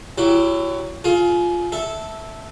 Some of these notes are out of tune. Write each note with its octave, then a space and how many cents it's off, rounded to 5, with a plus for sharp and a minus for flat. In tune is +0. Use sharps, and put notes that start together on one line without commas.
F#3 +15 E4 +40 G4 +25
F4 +0 G#4 +30
A4 +0 E5 -10